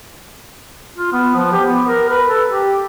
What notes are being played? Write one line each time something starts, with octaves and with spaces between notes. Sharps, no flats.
F4
B3
F3
G4
B3
A#4
B4
A4
G4